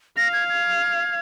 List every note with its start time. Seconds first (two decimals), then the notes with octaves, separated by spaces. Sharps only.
0.17 F5 A#6
0.33 G#6
0.49 G#6